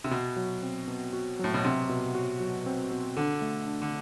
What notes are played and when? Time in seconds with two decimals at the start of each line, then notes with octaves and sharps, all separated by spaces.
0.04 C3
0.11 B2 F#4
0.36 F#3
0.63 C4
0.88 B2
1.13 F#4
1.39 A2 F#3
1.54 B2
1.64 C3 C4
1.89 B2
2.15 F#4
2.40 F#3
2.66 C4
2.91 B2
3.17 D3 A4
3.41 A3
3.67 D4
3.82 D3